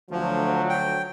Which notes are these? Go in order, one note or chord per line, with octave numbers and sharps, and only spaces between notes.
D2 F3 F#3
G5